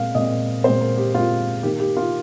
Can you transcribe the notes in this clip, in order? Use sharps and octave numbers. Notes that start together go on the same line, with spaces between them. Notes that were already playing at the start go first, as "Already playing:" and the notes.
Already playing: A#2 G#3 C4 F5
A#2 G#3 C4 D#5
A#2 G#3 C4 C5
A#4
G4
A#2 G#3 C4 F4
D#3 A#3 G4
G4
F4